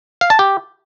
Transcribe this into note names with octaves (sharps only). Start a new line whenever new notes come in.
F5
A5
G4